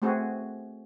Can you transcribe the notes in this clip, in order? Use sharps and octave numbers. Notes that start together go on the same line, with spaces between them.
A3 B3 C4 F#4 G#4